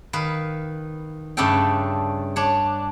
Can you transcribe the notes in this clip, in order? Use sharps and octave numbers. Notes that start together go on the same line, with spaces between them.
D#3 B4 F5
G2 C#3 A3 D4 A4 G5
D4 C#5